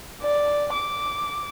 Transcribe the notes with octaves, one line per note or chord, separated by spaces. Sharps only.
D5
D6